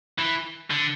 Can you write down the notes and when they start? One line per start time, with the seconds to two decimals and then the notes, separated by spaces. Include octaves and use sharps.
0.19 E3
0.71 D3